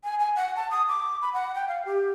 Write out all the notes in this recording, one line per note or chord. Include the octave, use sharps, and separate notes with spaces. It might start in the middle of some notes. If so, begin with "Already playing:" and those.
G#5
G#5
F#5
A5
D#6
D6
B5
F#5
G5
F5
G4